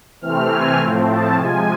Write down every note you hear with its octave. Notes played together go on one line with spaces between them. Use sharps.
C3 E3 A3 C4 F6
G#5
A2 F3 A3 C4
A5
C3 F3 G#3 G#5